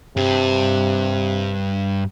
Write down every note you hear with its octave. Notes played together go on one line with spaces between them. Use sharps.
G2 C3